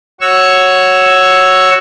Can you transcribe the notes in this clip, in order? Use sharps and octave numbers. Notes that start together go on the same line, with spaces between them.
F#4 C#5 C#6 E6